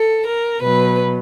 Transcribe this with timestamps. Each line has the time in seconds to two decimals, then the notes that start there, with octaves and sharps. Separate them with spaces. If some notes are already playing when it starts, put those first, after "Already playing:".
Already playing: A4
0.27 A#4
0.61 B2 F#3 B4